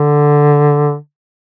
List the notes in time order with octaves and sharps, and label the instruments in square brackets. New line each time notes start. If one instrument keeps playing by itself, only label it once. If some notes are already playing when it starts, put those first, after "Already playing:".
Already playing: [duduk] D3